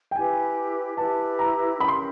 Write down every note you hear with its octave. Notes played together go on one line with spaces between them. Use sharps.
G5
E4 G4 B4 G#5
E4 G4 B4 A5
A#5
C#4 E4 G4 A#4 B5
C6